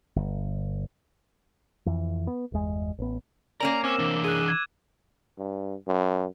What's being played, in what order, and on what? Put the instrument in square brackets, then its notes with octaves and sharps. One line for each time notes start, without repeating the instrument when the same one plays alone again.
[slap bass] G1
[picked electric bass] F2 E3
B3
G1 E2 G#3
A1 B3
[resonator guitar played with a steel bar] A#3 C#4 A#4 [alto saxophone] D5 [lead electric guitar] A#5
[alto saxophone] C4 [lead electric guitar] C#5 G#5 [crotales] D6 E6 E7
[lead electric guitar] E3 D4
[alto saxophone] G#4 [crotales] F#6 D#7
[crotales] G#6
[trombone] G2
F#2